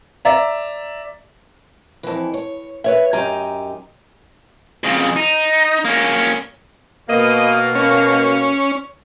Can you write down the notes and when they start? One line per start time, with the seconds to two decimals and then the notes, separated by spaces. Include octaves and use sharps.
0.25 D5 E5 A#5
2.03 F2 E3
2.34 C#5
2.84 B4 C#5 E5
3.13 F#2 D#4 G4 G#5 A#5
4.84 F2 C#3
5.16 D#4
5.85 A#3 C#4
7.09 B2 A#3 D#5
7.75 C#4